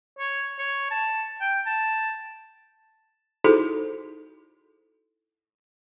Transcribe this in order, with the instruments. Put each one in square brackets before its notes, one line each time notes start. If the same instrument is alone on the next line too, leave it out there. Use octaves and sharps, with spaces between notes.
[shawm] C#5
C#5
A5
G5
A5
[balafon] D#4 E4 F#4 G#4 A4 C5